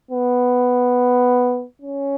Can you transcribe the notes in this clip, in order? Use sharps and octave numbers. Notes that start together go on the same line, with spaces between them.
B3
C#4